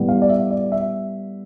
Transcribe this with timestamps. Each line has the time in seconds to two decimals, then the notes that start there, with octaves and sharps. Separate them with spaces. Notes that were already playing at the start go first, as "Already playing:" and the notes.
Already playing: A2 G3 B3
0.09 F5
0.22 D5
0.29 E5
0.50 D5
0.72 E5